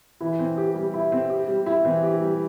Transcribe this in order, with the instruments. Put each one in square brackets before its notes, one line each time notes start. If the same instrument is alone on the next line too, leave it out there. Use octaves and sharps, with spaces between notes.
[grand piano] E3 [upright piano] E4
[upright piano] C4
G4
G3
E4
C4
G4
G3
E4
[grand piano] E3 [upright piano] C4
[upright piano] G4
G3